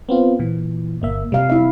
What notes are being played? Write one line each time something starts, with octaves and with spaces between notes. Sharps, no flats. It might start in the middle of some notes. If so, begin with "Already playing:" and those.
B3 C4 F4
A#2 E3
G1 A#3 E5
C3 G3 F5
E4 E5